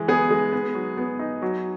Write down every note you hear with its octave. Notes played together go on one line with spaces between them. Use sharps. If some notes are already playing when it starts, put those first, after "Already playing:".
Already playing: E3 G#3
B3 G#4
G#3
B3
F#3
B3
D#4
F#3